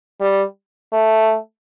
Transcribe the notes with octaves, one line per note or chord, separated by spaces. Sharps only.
G3
A3